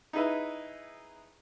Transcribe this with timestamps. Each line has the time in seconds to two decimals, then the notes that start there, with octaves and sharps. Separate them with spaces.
0.13 D#4 E4 G#4 B4 E5